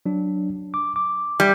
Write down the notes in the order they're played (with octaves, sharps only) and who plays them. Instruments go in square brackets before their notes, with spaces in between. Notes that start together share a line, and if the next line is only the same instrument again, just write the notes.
[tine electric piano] F#3 D4
D6
D6
[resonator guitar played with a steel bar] G3